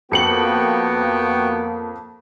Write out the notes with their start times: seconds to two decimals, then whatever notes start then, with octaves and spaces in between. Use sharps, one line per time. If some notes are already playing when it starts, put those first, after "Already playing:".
0.12 F2 A#3 B3 F#4 G5 C#7 F#7